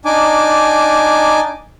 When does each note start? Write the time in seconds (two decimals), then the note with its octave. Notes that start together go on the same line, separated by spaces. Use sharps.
0.05 D4 D#4 G#5 D6